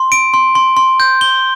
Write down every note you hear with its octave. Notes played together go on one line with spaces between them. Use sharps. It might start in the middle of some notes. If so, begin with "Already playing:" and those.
Already playing: C6
D7
C6
C6
C6
G6
G7